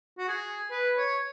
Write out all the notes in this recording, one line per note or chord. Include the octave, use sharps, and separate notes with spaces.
F#4
G#4
B4
C#5